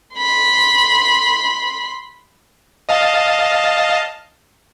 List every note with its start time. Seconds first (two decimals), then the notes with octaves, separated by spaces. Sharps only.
0.17 B5 C6
2.89 D#5 F5 A5